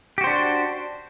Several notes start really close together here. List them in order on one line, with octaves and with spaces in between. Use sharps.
G4 F#4 C5 D4